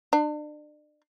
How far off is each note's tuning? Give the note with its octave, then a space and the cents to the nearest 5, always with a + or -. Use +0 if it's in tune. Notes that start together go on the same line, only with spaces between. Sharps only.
D4 +35